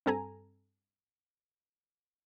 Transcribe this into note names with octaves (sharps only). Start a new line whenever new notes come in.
G2 C4 A4 G#5 A#5